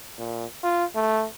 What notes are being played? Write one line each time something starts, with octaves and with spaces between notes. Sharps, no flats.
A#2
F4
A3